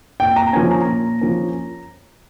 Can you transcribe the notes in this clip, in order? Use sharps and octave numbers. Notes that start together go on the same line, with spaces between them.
A#2 G5
A#5
F3 A#3 C#4 G#5
A#5
A#2
F3 A#3 C#4